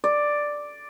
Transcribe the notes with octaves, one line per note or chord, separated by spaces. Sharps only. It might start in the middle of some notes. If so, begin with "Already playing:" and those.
D5